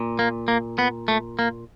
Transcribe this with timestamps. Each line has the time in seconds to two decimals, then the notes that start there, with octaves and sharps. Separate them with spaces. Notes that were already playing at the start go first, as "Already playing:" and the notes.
Already playing: A#2
0.19 A#3
0.48 A#3
0.79 B3
1.08 A3
1.39 A#3